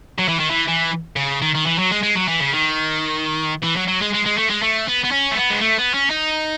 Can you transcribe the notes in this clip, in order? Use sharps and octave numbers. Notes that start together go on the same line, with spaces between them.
F#3
E3
D#3
E3
E3
C#3
D#3
D#3
E3
F#3
G#3
G#3
F#3
E3
C#3
D#3
E3
F#3
F#3
G#3
G#3
G#3
A3
G#3
A3
B3
B3
C#4
A3
B3
G#3
A3
B3
C#4
D#4